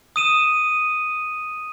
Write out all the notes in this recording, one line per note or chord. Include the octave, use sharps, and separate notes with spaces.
D#6 D#7 E7